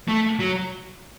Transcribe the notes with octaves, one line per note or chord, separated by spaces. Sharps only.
A3
F#3